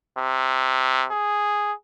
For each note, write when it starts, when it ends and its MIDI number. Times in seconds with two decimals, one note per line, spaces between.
0.18 1.05 48
1.11 1.72 68